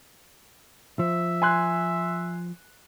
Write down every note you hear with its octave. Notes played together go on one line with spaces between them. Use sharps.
F3 E5
G#5 C6 F#6